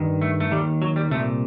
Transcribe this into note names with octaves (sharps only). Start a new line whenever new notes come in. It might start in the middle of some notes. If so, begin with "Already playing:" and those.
Already playing: G2 D#3
A3
A3
D#2 D#3 G3
F#3
G3
C2 A#2 A3